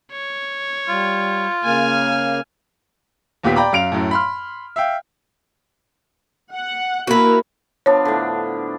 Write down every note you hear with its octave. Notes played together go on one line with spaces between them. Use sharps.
C#5
G3 F4
C#3 A#3 G#5 F6
D#2 A#2 B3 G4 F5 B6
D5 G5 A#5 B5 D6
F#2 F5 D7 F7
F#2 A2
B5 C6 F6
E5 F5 G5
F#5
A#3 E4 F#4 A#4 B4
F3 B3 D4 C#5
A2 D3